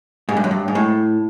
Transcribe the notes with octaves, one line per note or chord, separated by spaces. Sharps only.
G#2
G2
F#2
G2
G#2
A2